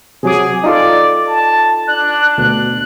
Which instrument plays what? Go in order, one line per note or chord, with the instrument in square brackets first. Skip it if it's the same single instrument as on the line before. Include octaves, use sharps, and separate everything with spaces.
[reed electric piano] C3 F#3 D6 [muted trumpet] G#4
[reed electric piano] D#4 F4 A4 [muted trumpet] D5
[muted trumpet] A5
[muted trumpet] D4 [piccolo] F#6
[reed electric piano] D2 B2 [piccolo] F#6